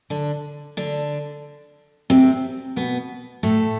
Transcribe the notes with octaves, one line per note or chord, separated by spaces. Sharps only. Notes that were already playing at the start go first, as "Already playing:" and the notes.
D3 D4
D3 D4
C3 C4
B2 B3
A2 A3